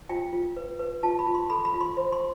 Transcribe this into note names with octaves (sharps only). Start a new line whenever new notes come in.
F4 G5
F4
B4
B4
F4 A5
B5
F4
C6
A4 B5
B5
F4
C6
C5
C6